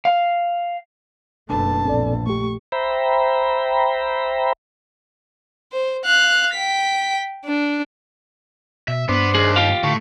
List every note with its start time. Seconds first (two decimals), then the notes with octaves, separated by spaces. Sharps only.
0.05 F5
1.49 F#1 B2 A3 D4 B4 A5
1.85 A#1 C4 A4 D5
2.27 A3 G4 C#6
2.72 C5 E5 G5 A#5 B5
5.73 C5
6.05 F5 F#6
6.54 G5 B6
7.45 D4
8.88 B2 E5
9.09 G2 B3 D4 C5
9.35 D#2 G#4
9.56 F4 G4 F5
9.84 A2 D3 C#6